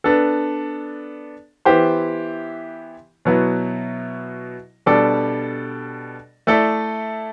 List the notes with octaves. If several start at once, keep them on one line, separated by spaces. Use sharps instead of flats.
B3 D4 A4
E3 B3 E4 G4 C5
B2 F#3 B3 E4
B2 G3 D4 A4 D5
A3 E4 A4 D5